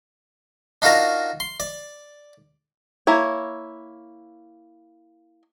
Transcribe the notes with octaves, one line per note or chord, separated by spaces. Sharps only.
D4 D#4 F4 F#4 A#4 A#5
C6
D5
A#3 E4 C#5